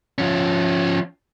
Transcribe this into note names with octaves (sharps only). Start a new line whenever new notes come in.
F3 C#4